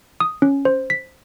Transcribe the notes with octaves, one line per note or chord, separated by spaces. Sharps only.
D#6
C#4
C5
B6